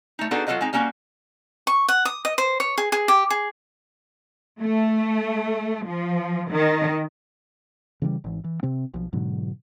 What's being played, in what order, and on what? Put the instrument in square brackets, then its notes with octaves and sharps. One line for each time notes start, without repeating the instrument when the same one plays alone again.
[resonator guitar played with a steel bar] A3 D#4
B3 D4 D#4 F#4 G#4 A4
F#3 F4 A4 B4 D#5 F#5
G#3 C4 D#4
G3 A#3 C#4 D#4 F#4
[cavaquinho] C#6
F#5
D#6
D#5
C5
C#5
G#4
G#4
G4
G#4
[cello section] A3
F3
D#3
[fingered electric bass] C#3 E3 F#3 G3
G#1 E3
E3
C3 C4
B1 F3
G#2 B2 D3 F#3